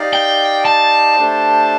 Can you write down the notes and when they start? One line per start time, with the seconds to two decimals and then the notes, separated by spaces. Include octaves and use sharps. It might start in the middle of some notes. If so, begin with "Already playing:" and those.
Already playing: D#4 G4 D5 F5
0.13 G5
0.65 A5
1.16 A3 D4 G4 C5